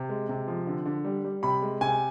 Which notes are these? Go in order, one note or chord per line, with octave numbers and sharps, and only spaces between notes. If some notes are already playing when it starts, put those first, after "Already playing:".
Already playing: C3
G#3
C3
F3
D3
D3
G3
G3
C3 B5
G#3
C3 G#5